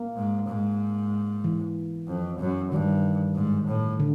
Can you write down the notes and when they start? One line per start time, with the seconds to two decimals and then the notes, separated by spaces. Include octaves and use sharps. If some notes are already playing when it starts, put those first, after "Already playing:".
Already playing: A#3
0.16 G#2
0.48 G#2
1.44 E3
2.08 F2
2.40 F#2
2.72 G2 D#3
3.36 G#2
3.68 A2
4.00 D3